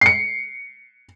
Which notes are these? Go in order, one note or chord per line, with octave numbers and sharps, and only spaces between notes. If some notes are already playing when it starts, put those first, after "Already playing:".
C7 C#7